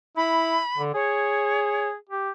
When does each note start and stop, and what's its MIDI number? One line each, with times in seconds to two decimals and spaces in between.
0.17 0.58 64
0.17 0.82 83
0.77 0.93 50
0.94 1.95 68
0.94 1.89 73
2.09 2.30 67